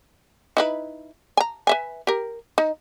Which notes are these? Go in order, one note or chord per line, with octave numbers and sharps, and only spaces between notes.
D#4 E4 B4
G#5 A#5
B4 E5 G#5
G4 A#4
D#4